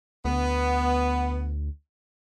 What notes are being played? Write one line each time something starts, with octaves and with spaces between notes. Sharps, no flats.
D2 B3